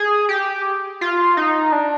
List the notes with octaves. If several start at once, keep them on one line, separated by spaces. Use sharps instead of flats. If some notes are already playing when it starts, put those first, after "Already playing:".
Already playing: G#4
G4
F4
D#4
D4